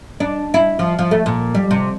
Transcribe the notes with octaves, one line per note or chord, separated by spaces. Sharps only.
D4
E4
F3
F3
A3
A#2
G3
C3